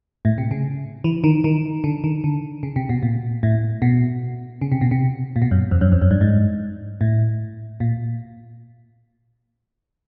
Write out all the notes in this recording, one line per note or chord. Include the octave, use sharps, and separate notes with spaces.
A2
C3
C#3
E3
D#3
D#3
D3
D#3
D3
C#3
C3
B2
A#2
A2
B2
C#3
C3
B2
C3
A#2
B2
F#2
F2
F#2
F2
F#2
G2
G#2
A2
A#2